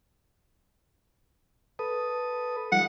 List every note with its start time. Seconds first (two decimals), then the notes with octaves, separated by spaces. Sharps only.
1.79 A4 B4 D#6
2.72 F3 G3 D#4 F#5